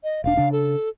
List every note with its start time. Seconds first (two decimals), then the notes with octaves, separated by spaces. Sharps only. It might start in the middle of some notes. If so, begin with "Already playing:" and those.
0.04 D#5
0.24 E1 D4 F5
0.37 C#3 D4
0.52 A4